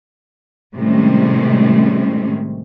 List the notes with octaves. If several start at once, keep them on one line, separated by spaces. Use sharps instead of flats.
A2 C3 D#3 G3 G#3 C#4